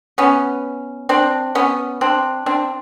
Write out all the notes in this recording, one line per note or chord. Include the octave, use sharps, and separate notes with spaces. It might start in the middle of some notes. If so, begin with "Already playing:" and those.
B3 C#4
C4 D4
B3 C#4
C4 D4
C4 D4